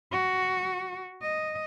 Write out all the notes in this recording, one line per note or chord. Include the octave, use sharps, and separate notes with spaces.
F#4
D#5